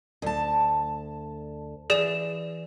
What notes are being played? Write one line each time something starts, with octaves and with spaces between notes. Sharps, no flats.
D2 A5
E3 G#4 D5 E7